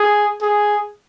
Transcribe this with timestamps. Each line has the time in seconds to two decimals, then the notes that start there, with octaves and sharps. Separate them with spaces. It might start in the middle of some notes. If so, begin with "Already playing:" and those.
Already playing: G#4
0.42 G#4